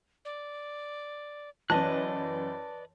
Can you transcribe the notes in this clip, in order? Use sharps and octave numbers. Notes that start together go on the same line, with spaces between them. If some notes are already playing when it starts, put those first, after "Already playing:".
D5
F#2 E3 B4 D5 D#5 A5 F#6